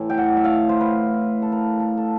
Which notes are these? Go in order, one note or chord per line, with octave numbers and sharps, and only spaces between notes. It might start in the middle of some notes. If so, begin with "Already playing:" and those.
Already playing: A2 E3 A3
G5
F#5
E5
F5
C5
B4
A4
A#4
A4
A4